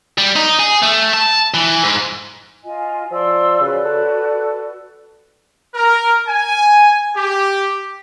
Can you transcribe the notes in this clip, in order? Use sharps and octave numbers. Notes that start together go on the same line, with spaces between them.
G3
D#4
G#4
A3
A5
E3
G#2
F4 D#5 G#5
F3 D5 C6 E6
C#3 F#4 B4 D5
A4
A#4
G#5
G4